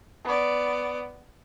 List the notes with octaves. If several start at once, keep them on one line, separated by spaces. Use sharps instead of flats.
B3 D5